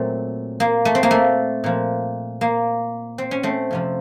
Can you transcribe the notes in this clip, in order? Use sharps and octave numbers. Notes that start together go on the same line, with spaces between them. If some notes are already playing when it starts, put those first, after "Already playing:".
Already playing: A#2 F#3 A3 C4
A#3
A3
C4
A#3
A3
A#2 F3
A#3
C4
C#4
A3 C4
F2 C3 F3